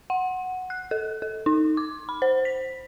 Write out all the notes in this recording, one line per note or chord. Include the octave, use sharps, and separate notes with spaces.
F#5
F#6
A4
A4
D#4
D6
B5
C5
B6